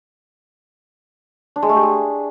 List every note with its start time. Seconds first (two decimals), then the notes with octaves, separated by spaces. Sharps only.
1.56 D4
1.62 G#3
1.69 A3
1.76 G4
1.83 G#4